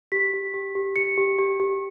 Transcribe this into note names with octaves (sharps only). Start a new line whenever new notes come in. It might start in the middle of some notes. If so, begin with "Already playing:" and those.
G4 B6
G4
G4
G4
G4 C#7
G4
G4
G4